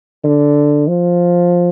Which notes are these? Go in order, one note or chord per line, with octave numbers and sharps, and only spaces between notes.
D3
F3